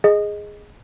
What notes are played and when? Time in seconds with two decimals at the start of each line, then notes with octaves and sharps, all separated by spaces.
0.04 G#4 D#5